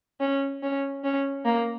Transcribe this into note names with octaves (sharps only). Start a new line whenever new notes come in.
C#4
C#4
C#4
A#3